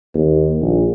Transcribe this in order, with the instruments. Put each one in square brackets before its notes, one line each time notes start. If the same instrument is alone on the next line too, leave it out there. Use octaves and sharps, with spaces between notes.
[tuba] D#2
A#1